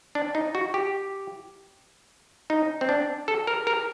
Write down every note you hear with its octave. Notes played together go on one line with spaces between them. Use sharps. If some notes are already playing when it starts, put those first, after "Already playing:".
D4
D#4
F#4
G4
D#4
C4
D4
A4
A#4
A#4